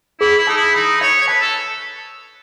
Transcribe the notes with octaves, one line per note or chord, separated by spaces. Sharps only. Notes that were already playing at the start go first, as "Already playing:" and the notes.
E4 G#4
E4
D#4 A5
E4
D#4 B5
C#5 E5
C#5
B4 A5
A4